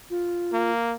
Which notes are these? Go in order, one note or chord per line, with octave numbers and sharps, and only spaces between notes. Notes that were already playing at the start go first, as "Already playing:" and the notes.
F4
A#3